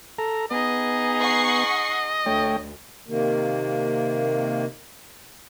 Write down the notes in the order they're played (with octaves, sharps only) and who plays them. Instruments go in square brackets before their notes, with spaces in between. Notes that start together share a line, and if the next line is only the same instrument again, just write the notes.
[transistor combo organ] A4 A#5
[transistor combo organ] B3 [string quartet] D#4 G#4 [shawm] D#5
[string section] F#5 C#6 C7
[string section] D2 [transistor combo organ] A3 C#5 G5
[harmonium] C3 D#3 A#3